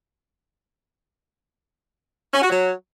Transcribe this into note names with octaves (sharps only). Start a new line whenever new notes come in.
C#4
F#4
F#3